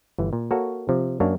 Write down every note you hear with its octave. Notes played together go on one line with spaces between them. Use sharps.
G1 E3
A#2
A#3 F#4 A4 A#4 C#5
C3 F3
F#2 A#3 D4 C#5